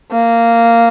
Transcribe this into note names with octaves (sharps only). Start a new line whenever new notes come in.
A#3